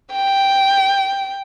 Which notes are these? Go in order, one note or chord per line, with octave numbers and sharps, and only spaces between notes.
G5